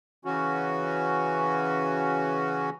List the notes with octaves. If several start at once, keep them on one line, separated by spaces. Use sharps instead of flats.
C#3 E3 C#4 F#4